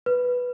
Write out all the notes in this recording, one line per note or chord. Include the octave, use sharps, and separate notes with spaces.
B4